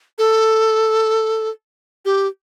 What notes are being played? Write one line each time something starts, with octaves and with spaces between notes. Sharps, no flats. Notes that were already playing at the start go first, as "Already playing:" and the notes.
A4
G4